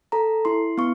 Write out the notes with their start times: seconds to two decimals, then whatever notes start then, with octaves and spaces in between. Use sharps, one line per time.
0.12 A4 A#5
0.45 E4 C6
0.78 B3 C#6